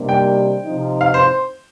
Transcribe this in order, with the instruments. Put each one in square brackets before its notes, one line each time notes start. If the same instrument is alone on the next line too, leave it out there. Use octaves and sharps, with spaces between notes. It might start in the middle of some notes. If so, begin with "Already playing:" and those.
Already playing: [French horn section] C3 D#3 G3 A#3 D4
[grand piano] G5
[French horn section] C3 F3 C4 D#4
[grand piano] F5
C5